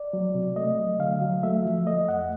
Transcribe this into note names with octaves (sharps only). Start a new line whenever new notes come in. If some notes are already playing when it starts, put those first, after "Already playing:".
Already playing: D5
F#3
C3
A3 D#5
F#3
D3 F5
F#3
A3 E5
F3
A3 D#5
F2 F#5